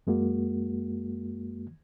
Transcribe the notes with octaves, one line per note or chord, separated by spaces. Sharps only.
F#2 G#3 A#3 F#4